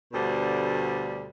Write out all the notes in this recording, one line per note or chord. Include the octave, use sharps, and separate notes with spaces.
D2 B2 D3 G3 C5